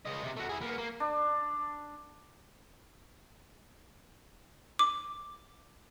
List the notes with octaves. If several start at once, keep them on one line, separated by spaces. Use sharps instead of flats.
C#3 D#5
C3
A3 F#4
E4 G#4
A#3 B3
A#3
D4
D6